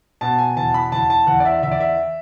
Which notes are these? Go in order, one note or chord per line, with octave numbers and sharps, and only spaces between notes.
B2 A5
G#5
E2 A5
B5
E2 A5
A5
E2 F#5
D5
E5
E2 E5
D5
E5